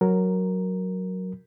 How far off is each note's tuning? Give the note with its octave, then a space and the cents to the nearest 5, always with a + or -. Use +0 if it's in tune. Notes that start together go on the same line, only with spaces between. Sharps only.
F#3 +0 A#4 +0